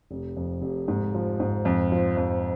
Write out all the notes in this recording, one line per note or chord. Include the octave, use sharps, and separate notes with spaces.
F1
F2
F1
G#2
F3
G#2
F2
F3
F2